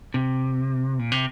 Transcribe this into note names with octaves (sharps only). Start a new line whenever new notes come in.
C3
A#2
C3